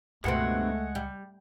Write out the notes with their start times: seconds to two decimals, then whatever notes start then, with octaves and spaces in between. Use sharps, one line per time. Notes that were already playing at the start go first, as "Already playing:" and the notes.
0.24 C#2 G2 B2 G#3 A3 C4 F#5
0.95 G3